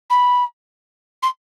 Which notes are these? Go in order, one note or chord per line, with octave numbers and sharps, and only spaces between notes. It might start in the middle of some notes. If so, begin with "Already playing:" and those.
B5
C6